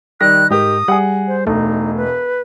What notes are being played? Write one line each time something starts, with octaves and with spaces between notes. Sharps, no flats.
D#3 G3 F#6 A#6
G#2 D#4 G4 A#4 D#6
G3 G#4 F#5
C5
E1 A3 D#4
B4